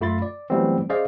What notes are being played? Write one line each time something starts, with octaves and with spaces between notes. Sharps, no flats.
F#2 A3 F4 B5 C6 A6
D5
E3 F#3 G3 A3 B3 C4
C#4 G#4 C5 D5 D#5 F5